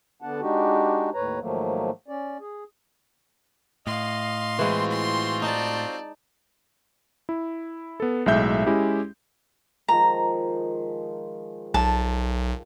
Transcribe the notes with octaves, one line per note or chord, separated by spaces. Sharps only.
D3 B3 D4 F#5 A5
G#3 D4 D#4 F#4 G4
D#2 A2 B4 C#5 A#5
G#2 D#3 F3 F#3 A3 A#3
C#4 D5
G#4
A2 D#5 F5 C6
E3 G#3 C4 F4 F#4
C6
D#4 D5 A5
E4
B3 A4
B1 A2 G#3 E5 G6
G#3 C#4 E4 G4
D#3 F3 G#3 A#5
B1 A5